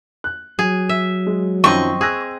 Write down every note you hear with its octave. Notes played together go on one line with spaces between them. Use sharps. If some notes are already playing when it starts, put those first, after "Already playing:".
F#6
F#3 G#4
E5
G#3
F#2 D#3 F3 C4 D#5 C#6
G#4 E6 F#6 A#6